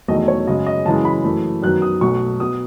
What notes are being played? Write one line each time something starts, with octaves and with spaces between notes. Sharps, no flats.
E1 E2 D#3 F#3 A3 D#5
C#5
F#2 C#3 G#3 D#5
D#5
F#2 C#3 E3 G#3 A5
B5
F#2 E3 A3
F#2 D#3 F#3 B3 F#6
D#6
B1 B2 A3 C#6
B2 D#6